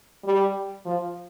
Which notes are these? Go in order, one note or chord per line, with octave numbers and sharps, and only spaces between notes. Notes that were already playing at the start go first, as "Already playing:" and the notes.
G3
F3